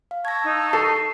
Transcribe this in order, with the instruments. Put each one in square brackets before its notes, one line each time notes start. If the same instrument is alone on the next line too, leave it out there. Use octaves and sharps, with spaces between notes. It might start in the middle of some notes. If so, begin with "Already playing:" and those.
[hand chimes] F5
[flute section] A5 C#6 E6 [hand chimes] G#6 A#6
[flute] D#4
[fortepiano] A4 [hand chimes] C7